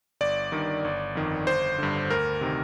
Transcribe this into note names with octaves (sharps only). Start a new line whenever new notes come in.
G1 D5
G2 D#3
G1
F2 D#3
G1 C5
G2 D3
D2 A#4
C3 D#3